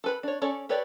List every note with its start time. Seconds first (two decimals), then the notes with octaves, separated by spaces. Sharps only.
0.04 A4 B4 B5
0.23 D4 C#5
0.42 C#4 A4 C#5 D5
0.69 G4 A4 B4 C#5 D5